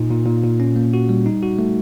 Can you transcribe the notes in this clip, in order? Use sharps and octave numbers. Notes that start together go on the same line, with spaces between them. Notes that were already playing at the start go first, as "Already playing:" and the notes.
Already playing: A#2 D#4
A#2
A#2
A#2
C#4
A#3
F#4
G3
D#4
F#4
A3